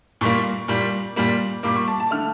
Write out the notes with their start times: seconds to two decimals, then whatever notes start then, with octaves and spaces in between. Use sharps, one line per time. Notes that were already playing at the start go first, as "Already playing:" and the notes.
0.21 A#2 G3 A#3 C#6
0.68 A#2 G3 A#3
1.16 A#2 G3 A#3
1.63 A#2 G3 A#3 D6
1.76 C#6
1.88 A5
2.00 A5
2.11 D3 A3 F6